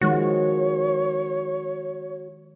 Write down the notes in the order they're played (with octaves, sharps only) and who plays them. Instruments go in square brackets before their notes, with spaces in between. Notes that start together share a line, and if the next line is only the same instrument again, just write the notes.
[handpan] D#3 F3 G#3 [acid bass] F#4 [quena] C#5